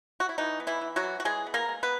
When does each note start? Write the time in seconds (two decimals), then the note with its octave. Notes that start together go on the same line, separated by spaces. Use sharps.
0.20 F#4
0.29 E4
0.38 E3 D#4
0.60 B3
0.67 E3 E4
0.81 E3
0.96 F#3 F#4
1.03 E3
1.20 F#4
1.25 E3 G#3 G#4
1.46 B3
1.54 A#3 A#4
1.69 G#3
1.83 B3 B4